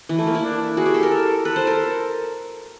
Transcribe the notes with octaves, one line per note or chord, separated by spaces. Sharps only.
E3
A3
A#3
E4
D4
F#4 G#4
G4
A4
A#4
A4
A4 B4
C5
A#4